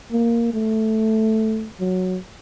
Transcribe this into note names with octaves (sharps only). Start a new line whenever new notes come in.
A#3
A3
F#3